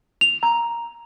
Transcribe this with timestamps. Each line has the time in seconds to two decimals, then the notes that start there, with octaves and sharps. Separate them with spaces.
0.21 F7
0.43 A#5